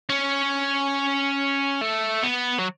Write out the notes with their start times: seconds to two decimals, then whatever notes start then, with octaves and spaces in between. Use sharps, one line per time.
0.09 C#4
1.81 A3
2.24 B3
2.59 F#3